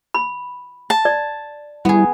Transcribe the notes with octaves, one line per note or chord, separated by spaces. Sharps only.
B5
A5
D5
G3 B3 E4 G#4